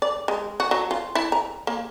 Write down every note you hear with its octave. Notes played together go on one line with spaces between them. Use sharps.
D5
G#3
F#4
F#3
F4
E4
A#5
A#3